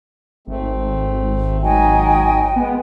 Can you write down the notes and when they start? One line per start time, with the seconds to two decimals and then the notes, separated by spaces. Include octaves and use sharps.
0.47 G#1 A3 C4
1.62 F#3 D#4 F#4 D#5 G5 G#5
2.56 G#3 B3